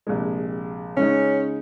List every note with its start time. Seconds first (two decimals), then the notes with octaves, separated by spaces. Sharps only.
0.07 A#1 C3 G#3
0.97 C#3 G#3 C#4 D#4